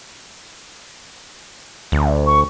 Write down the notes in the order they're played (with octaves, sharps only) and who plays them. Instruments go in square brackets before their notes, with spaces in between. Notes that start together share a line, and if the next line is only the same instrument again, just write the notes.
[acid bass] D2
[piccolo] C#6